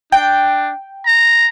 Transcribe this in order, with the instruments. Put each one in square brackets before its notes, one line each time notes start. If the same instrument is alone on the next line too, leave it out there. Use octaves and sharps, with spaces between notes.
[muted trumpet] D4 [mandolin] G5
[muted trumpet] A#5